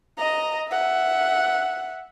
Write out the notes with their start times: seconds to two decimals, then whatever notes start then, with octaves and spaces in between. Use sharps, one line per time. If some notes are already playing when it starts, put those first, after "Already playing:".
0.18 D#5 A#5
0.68 E5 F#5